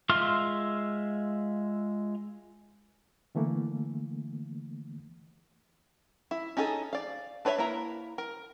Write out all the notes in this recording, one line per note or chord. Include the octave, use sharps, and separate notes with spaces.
G#3 F4 E5 C6 F6
D3 E3 A3 A#3
E4
C#4 D#4 G#4 A4
D5 F5
D4 B4 C#5 D5 E5
A#3 E4 A#5
A#4